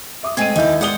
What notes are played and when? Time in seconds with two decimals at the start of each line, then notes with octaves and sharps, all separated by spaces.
0.23 E5 D6 D#6
0.37 G#3 A3 C4 G#6 D#7
0.56 D#2 D#4 E4 D5 G6
0.81 G#3 D5 F#5 D#6 G7